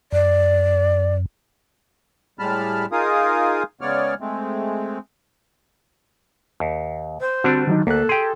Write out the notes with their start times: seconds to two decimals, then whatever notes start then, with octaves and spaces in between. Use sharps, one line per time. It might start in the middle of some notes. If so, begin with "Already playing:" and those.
0.12 F#2 D5
2.39 A2 G3 G#3 A5 B5 F6
2.92 D#4 F4 G#4 A#4 F5 D#6
3.81 C#3 G#3 B3 C#5 D5 F6
4.21 G#3 A3 C4
6.60 D#2
7.20 C5
7.44 D3 G3 C4 D4 F#4
7.67 D#3 F#3 D#4
7.87 D2 A#3 A4 F#6
8.09 G4 G#4 G5 C6